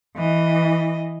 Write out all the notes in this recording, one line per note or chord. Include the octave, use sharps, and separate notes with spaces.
E3 D#5